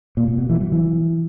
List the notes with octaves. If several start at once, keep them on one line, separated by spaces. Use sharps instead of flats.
A#2
A#2
B2
E3
F#3
E3